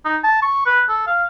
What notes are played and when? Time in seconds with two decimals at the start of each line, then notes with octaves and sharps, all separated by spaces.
0.05 D#4
0.24 A5
0.42 C#6
0.66 B4
0.89 A4
1.07 F5